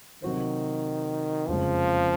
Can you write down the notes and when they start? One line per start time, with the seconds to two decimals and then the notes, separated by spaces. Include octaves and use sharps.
0.22 C3 D#3 F#3 C4 F#4 C5
1.48 F#1 F2 C#3 F3 G#3